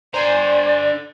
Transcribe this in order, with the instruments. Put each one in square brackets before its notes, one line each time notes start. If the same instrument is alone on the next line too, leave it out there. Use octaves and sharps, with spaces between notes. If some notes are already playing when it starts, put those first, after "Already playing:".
[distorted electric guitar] D3 A#5 [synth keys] C5 G#5 [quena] D5